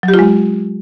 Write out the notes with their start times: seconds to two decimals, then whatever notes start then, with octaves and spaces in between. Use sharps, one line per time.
0.03 F#3
0.08 G4
0.14 F4
0.19 G#3